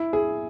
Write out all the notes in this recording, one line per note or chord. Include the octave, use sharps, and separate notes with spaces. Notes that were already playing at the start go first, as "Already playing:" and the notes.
Already playing: E4
G#4